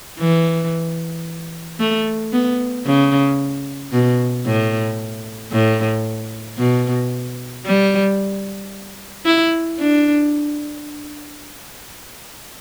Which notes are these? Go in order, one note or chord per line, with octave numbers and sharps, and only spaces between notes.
E3
A3
B3
C#3
B2
A2
A2
B2
G3
E4
D4